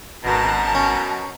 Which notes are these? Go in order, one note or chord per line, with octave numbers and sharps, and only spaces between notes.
G#1 F#2 B2 A5 A#5
C#4